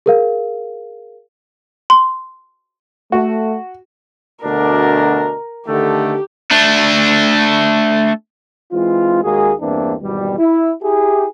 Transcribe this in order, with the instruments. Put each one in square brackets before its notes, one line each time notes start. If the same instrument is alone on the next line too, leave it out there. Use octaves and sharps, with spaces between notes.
[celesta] G#4 A#4 F5
[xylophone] C6
[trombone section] A3 [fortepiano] F#4
[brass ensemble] D2 B2 D4 [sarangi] A#4
[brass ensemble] D3 D#3 A3 [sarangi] G4
[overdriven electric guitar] A3 D4
[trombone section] E3 G#3 C4 F4
D#2 G#3 A#3 F#4 G#4
E2 G2 E3 A#3 C4 D4
G#1 E2 B2 G3
E4
E4 G4 G#4